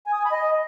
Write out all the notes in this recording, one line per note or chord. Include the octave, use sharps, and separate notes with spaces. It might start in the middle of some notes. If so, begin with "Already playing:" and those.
G#5
D#6
G#5
B5
D#5